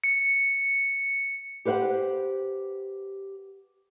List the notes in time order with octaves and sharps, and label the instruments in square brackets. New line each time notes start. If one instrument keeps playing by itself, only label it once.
[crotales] C#7
[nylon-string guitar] G4 B4 C5 F5 F#5